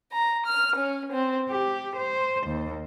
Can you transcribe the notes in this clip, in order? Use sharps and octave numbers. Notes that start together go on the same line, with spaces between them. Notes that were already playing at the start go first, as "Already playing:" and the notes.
A#5
F6
C#4
C4
G4
C5
D#2